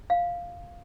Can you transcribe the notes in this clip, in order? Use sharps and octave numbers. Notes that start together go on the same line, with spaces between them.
F5